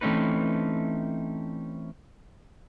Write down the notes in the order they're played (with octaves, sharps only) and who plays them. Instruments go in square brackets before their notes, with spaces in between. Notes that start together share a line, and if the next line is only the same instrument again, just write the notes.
[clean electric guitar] E3 A3 C4 C#4 D#4 B4